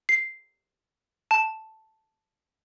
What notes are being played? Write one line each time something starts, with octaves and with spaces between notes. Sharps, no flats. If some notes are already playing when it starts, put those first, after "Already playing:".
C7
A5